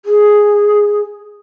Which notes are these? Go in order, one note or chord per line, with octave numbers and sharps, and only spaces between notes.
G#4